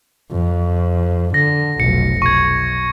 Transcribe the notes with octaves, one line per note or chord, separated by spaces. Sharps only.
F2
D3 A#6
F1 B1 C#7
B1 C#6 G#6